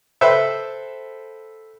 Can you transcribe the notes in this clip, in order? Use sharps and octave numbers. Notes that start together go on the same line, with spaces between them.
A4 B4 C5 E5 G5